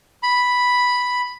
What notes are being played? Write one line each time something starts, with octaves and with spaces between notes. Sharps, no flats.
B5